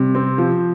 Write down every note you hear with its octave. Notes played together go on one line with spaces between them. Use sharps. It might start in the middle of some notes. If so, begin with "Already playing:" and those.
Already playing: C3 G3
C4
F3